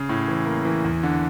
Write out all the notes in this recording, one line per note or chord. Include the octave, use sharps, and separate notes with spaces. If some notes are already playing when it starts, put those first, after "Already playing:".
Already playing: C#3
A2
E3
A#3
E3
E2
D3